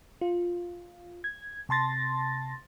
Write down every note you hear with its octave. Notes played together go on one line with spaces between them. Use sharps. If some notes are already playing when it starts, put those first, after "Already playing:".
F4
G#6
C3 A5 C6 A6 A#6